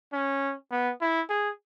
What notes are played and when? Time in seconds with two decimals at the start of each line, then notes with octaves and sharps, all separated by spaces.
0.13 C#4
0.72 B3
1.01 E4
1.30 G#4